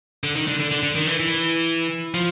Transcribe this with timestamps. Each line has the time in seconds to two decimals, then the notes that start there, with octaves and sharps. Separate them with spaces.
0.24 D3
0.36 D#3
0.48 D3
0.60 D3
0.71 D3
0.83 D3
0.95 D#3
1.07 E3
1.19 E3
2.14 F3